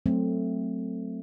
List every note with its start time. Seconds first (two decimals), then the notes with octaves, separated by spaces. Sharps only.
0.06 F#3 A3 C4